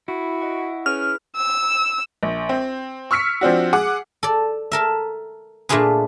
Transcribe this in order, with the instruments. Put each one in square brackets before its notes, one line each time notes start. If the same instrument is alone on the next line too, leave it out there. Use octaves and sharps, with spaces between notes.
[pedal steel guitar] E4 [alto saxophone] F#4
[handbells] D#5 F#5 C#6
[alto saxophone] C#4 [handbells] G#4 B4 [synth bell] F6
[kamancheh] E6
[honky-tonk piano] A#1
C4
C#6 E6 F6 B6 C#7
F3 C4 D4 F#4
G#4 F#5 D6
[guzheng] A4 D5
A4 A#4 E5
A#2 A3 D4 F4 G#4 B4